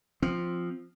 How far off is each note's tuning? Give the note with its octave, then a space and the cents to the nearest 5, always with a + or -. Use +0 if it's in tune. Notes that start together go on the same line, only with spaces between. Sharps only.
F3 +0 C4 +0